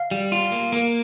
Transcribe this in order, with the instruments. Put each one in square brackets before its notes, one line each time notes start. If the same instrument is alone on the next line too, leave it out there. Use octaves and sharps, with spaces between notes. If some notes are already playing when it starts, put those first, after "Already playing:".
Already playing: [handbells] F5
[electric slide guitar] G3
F4
A#3
A#3